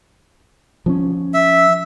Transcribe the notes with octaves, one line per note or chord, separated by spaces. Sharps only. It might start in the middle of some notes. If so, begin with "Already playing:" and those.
F3 C4 C#4
E5